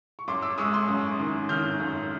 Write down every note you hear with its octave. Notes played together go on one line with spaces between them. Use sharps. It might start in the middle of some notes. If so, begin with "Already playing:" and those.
C#6
F#2 C6 D6
D6 E6
G#3 C#6 D#6
C6 D6
F#2
D#3
D#3 F6 G6
F#2